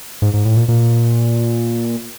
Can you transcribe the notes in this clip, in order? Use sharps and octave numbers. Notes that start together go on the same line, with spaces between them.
G#2
G#2
A2
A#2
A#2